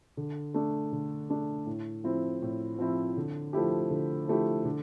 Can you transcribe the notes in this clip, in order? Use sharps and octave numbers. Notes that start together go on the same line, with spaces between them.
D3
A3 D4
D3
A3 D4
A2
F3 C4 E4
A2
F3 C4 E4
D3
F3 A3 E4 G4
D3
F3 A3 E4 G4
D3